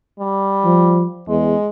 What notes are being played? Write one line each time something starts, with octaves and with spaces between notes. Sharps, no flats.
G3
F3
E2 G#3